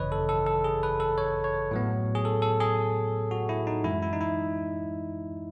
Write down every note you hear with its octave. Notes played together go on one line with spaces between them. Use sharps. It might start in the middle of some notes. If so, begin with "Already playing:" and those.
Already playing: G#1 F#2 C#3 E3 B4 C#5 D#5
A4
A4
A4
G#4
B4
A4
C#5
C#5
A2 F#3 B3
G#4
A4
A4
G#4
F#4
E4
D#4
F#2 E3 G#3 E4
E4
D#4
E4